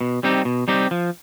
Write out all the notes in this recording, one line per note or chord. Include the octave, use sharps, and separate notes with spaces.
B2
G3 C4 D#4 G4
B2
G3 C4 D#4 G4
F3